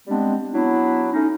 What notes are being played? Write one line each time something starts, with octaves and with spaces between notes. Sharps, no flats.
G3 G#3 B3 C4 D4
F#3 B3 D4 E4
A3 C#4 D#4